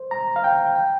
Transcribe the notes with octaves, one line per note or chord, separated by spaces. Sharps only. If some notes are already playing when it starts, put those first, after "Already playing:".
Already playing: C5
A#5
F5
G5
G5